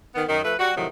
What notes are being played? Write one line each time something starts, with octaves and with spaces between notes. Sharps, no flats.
D#3 B3
F#2 D#3
F3 A3 B4
G3 F#4
A2 C3 D#3 F3 F#3